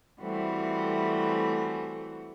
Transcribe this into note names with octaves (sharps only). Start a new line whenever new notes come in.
E3 G3 A3 C4 F#4